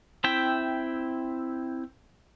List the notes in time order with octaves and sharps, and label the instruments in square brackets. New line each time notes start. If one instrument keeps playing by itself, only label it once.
[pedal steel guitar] C4 E4 E5 G5